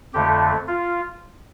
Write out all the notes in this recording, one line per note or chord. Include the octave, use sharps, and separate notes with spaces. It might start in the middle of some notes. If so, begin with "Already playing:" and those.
F2 D3 A3 G4
F4